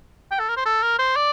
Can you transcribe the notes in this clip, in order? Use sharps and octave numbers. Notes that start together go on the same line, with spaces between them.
G5
A4
A#4
C5
A4
A#4
C5
D5